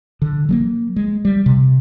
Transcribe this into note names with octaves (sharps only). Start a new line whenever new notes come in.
D3
F#3 G#3 A#3
G#3
G3
C3